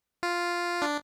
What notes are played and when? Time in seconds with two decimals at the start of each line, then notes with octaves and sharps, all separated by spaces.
0.23 F4
0.82 D4